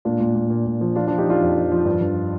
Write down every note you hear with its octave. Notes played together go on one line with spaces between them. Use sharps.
A#2 D4 F4
A#2
A#2
A#2
A#2
F3
F3 D4 F4
F3 D4 F4
D#4 G4
F3 D4 F4
F2
F3
F3
G2
G2